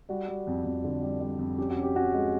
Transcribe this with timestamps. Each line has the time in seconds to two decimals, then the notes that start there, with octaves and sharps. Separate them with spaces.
0.09 G3 F#4
0.28 G3
0.47 F2
0.64 F2
0.84 D3
1.02 G3
1.21 G3
1.39 F2
1.58 C#4 G4
1.70 F#4
1.77 C#4
1.82 G4
1.96 C#4 F#4
2.13 G#3